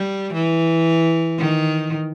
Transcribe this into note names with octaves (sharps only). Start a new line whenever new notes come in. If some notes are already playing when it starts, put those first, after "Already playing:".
Already playing: G3
E3
D#3